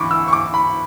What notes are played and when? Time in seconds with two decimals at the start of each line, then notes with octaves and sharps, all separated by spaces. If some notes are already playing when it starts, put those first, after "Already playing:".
Already playing: D2 E3 B5 C#6 D6
0.11 E6
0.28 C#6
0.33 D6
0.54 B5